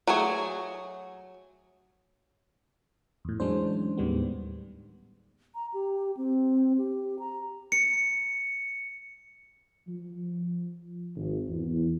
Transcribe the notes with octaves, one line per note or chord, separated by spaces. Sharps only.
F#3 A3 G#4 C#5
E2 A2
E3 F#3 G#3 C#4 D4 C5
D#2 A2 D#3 G3 G#3 B3
A#5
G4
C4
G4
A#5
C#7
F3
G#1
E2